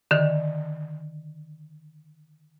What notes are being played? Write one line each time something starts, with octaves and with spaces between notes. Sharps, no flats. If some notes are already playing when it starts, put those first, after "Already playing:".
D3 D#3